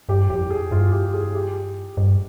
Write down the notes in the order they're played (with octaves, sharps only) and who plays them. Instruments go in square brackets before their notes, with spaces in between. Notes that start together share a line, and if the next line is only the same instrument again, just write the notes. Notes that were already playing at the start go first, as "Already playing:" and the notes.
[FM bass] G2 [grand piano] G4
[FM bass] F2 [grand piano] G4
[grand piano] G#4
[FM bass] G2 [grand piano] F4
[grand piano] G4
G#4
G4
[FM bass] G2